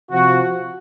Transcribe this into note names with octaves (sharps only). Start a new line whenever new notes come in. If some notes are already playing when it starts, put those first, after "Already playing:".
C3 F3 F#4